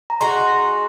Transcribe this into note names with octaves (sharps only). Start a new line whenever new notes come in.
A#5
G#3 D#4 F#4 C6